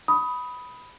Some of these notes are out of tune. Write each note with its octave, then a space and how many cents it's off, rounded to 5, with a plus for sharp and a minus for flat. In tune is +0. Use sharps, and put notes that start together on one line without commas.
B5 +0 D#6 +15